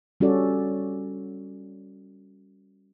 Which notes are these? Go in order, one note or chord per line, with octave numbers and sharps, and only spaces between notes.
G3 C#4 F#4 A4 D5